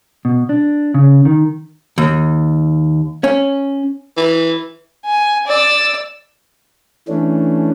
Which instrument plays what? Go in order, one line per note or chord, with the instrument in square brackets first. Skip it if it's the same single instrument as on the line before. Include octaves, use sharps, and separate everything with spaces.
[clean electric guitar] B2
D4
C#3
D#3
[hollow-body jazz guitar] D#2
C#4
[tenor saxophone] E3
[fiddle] G#5
D5 E6
[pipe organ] E3 A3 C#4 D4